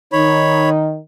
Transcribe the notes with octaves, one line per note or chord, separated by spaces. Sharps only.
D#3 D#4 C#5 B5